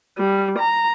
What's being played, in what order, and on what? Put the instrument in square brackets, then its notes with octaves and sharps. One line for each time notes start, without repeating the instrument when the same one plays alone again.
[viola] G3
A#5